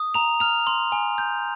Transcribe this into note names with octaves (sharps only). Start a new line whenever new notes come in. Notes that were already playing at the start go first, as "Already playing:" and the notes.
Already playing: D#6
A#5 F7
F6 F7
C6
G#5
G6